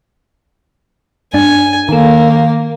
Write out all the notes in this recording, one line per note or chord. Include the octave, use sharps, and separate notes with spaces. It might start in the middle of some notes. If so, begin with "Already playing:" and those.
G2 D4 G#5
D#3 A#3 A4